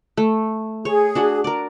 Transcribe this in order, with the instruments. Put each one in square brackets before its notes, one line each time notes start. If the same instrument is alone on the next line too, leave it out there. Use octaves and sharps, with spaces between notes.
[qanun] A3
[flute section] G#4 [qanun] C#5
[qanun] D4 F#4 F#5
A#4 D5